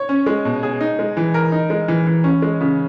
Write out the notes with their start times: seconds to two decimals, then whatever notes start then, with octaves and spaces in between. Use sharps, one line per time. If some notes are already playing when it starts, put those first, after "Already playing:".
Already playing: C#5
0.09 C#4
0.26 G#3
0.45 B2
0.63 G#4
0.81 D#4
0.99 G#3
1.17 E3
1.34 A#4
1.52 D#4
1.70 G#3
1.88 E3
2.07 E3
2.24 C#4
2.42 G#3
2.61 C#3